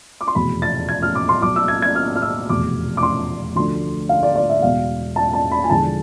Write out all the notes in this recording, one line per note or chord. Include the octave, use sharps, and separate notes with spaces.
D6
C6
F1 E2 B2 B5
A6
G#6
F6
D6
C6
B1 B2 D6
E6
G#6
G#6
F6
F6
E6
F1 E2 B2 D6
D6
C6
D2 D3 F3 C6
F5
D5
D5
E5
E1 E2 B2 F5
A5
A5
B5
G#5
E1 E2 D3 F3 A5